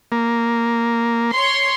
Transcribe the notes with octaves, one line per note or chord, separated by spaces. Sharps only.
A#3
C#5 C6